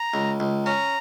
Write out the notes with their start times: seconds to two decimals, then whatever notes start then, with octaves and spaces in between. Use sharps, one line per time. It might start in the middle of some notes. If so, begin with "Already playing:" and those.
Already playing: A#5
0.14 C#2
0.40 C#2
0.66 C#4 A#5